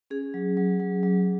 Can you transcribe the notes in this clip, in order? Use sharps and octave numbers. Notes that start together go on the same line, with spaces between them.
C#4 G#4
F#3
F#3
F#3
F#3